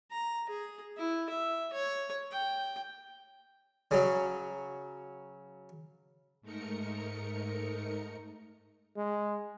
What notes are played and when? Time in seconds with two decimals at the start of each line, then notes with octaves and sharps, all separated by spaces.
0.11 A#5
0.50 G#4
0.97 E4
1.30 E5
1.73 C#5
2.32 G5
3.91 C#3 F#3
6.42 G#2 A3 D#4 A#4 C#7
8.97 G#3